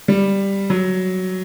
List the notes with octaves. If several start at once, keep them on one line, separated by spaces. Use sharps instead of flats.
G3
F#3